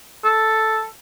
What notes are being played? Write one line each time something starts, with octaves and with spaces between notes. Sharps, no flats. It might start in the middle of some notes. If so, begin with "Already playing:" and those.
A4